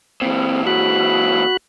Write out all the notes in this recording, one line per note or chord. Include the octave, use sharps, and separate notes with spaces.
A#2 E3 C4
F#4 B5 F#6